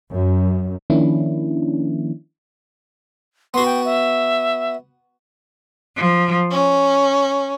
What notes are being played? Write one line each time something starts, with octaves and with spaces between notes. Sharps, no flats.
F#2
D#3 F3 A#3 C#4 D4 E4
B3 F#4 C6
G5
E5
F3
C#4